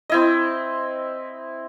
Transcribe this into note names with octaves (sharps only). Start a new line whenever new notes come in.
C4 E4 D#5